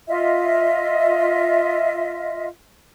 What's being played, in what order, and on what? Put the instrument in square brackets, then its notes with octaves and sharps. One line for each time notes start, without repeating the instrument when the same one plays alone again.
[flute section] F4 D#5 E5